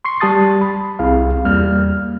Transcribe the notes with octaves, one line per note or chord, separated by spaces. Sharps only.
C6 C#6 C7
G3 G4 A5 D#6 A6
B5
C2 C4 E4 G#4 F5
E2 G3 A#3 F6